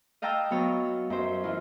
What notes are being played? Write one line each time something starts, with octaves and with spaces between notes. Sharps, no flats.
D#5 F5 G5 A5 A#5 E6
F#3 B3 C#5
F#2 C5
E3 E4 F4